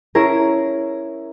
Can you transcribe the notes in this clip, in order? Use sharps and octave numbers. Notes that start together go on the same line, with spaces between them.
C#4 E4 G#4 A#4